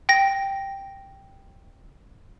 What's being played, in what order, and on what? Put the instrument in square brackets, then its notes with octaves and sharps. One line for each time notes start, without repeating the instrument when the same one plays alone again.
[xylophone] G5 A#6